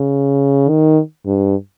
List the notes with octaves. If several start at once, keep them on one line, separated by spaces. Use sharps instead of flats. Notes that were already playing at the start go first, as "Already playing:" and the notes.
Already playing: C#3
D#3
G2